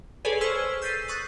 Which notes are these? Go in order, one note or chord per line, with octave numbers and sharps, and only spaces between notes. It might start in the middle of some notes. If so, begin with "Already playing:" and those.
G#4 A4 B4 C#5 D5 G#5
C5 C#6 E6 F6 G#6 B6
E6 G6 A6 B6 C7 D#7
C#6 D#6 F#6 A6